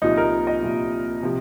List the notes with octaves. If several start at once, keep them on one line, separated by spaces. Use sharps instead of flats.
C2 A#2 F3 D#4
A#4
D#5
C2 A#2 F3
C3 F3